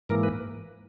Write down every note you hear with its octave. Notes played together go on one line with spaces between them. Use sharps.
G#2 E3 A#3 A#4
B4